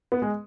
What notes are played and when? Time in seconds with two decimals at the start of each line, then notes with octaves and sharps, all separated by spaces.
0.12 B3
0.22 G#3